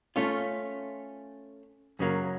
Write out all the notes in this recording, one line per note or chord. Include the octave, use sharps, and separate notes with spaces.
A3 C#4 F4
F#2 C#3 F#3 A#3